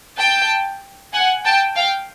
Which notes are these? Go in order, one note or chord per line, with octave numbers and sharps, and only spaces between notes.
G5 A5
F#5 G#5
G5 A5
F5 G5